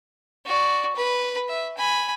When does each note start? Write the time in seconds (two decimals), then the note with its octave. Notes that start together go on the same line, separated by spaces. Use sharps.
0.46 F#4 D5
0.96 B4
1.49 E5
1.77 G#5 B5